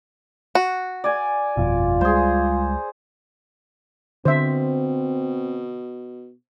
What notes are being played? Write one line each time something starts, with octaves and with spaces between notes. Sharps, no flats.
F#4
D5 G#5
G1 F2 B2 F4
C#2 G3 G#3 G#4 C5
B2 D3 C4 C5 E5